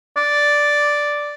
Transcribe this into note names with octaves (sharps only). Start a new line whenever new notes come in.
D5